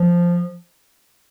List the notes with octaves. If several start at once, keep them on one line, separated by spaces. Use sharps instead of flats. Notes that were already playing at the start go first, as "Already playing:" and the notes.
Already playing: F3